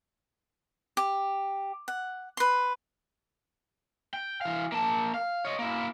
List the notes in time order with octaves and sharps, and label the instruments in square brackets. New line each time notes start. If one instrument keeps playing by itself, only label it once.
[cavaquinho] G4
F#5
B4 C6
[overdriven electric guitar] G5
E3 F5
A#3 A5
F5
C#5 D#5
A#3 E4